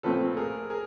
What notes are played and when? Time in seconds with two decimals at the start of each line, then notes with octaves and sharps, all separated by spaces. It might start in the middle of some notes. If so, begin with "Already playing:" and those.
0.03 A#2 F3 A3 C4 A4 B4
0.37 G#4 A#4
0.70 G#4 A#4